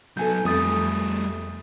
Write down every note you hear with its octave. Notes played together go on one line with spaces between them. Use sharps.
F#3 B3 A4 G#5 G6
F2 G3 A3 D#6 A6